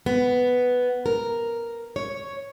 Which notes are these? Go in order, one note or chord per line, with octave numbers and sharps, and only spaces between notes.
B3
A#4
C#5